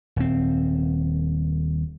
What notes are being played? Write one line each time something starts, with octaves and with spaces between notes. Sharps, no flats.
D#1 C4